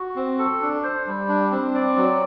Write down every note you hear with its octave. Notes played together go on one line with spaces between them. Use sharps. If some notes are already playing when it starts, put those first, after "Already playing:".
Already playing: F#4
C4
A4
D4
C5
G3
D4
C4
D5
F#3